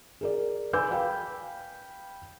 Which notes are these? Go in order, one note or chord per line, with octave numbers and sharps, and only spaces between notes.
G#4 A#4 D5
B4 G#5 D6 E6 G6
F5 G5 B5